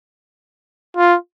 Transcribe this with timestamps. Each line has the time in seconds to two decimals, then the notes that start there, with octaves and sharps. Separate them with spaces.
0.97 F4